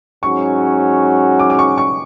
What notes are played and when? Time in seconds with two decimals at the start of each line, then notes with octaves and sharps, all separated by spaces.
0.23 G#2 F#3 C#4 F#4 C#6
1.40 D6
1.50 D6
1.59 C#6
1.78 C#6